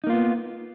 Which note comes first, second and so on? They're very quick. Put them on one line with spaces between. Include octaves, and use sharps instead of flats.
D#4 A#3 F4 B3